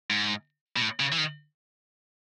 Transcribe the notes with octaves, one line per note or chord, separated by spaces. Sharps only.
G#2
B2
A2
C#3
E3
D#3